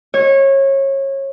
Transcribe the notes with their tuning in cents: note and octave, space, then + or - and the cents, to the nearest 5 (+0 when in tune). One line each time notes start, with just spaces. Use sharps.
C#5 -25